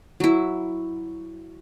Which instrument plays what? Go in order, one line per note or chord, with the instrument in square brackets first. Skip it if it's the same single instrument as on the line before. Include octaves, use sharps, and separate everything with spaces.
[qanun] F#3 E4